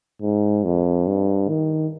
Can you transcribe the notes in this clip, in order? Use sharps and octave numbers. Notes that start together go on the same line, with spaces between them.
G#2
F2
G2
D#3